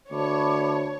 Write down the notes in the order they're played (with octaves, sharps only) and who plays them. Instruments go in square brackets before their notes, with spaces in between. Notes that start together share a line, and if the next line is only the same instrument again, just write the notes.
[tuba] D2 [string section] C#5 [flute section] A5 B5 D6